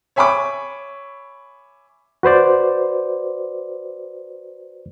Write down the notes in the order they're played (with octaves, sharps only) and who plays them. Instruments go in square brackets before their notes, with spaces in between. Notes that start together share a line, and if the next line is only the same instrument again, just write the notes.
[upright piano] C#5 E5 G#5 B5 C#6 D6
[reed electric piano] F#4 B4 C5 D5